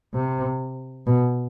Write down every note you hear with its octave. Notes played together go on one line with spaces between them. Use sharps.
C3
B2